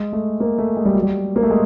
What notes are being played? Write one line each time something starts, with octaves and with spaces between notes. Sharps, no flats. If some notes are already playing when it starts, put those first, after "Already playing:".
Already playing: G#3
A3
A#3
A3
G#3
G3
F#3
G3
A#3
A3
G#3